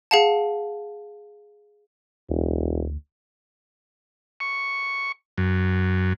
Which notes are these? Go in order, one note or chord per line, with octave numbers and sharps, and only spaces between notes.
G#4 F5 F#5 A5
E1 D2
C#6
F#2